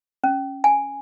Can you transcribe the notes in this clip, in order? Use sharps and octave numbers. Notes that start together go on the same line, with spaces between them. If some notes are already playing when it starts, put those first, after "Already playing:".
C#4
G#5